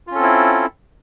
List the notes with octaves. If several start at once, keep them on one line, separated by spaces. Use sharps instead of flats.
C4 C#4 E4 F4 A4